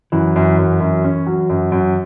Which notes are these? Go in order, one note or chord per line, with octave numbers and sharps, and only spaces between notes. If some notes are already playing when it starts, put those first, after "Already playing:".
F#2 E3
F#2
F#2
F#2
C#4
F#3
F#2
F#2